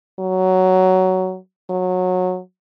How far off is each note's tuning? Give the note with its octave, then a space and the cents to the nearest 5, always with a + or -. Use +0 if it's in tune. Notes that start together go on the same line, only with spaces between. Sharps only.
F#3 +10
F#3 -20